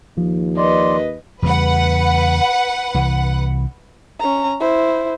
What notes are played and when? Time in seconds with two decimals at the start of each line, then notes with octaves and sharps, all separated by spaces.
0.17 D#2 F3
0.58 B4 D5 D#5 C6
1.42 E2 C#3 G3 B4 F#5
2.94 C2 E3
4.20 C#4 A#5
4.60 E4 C5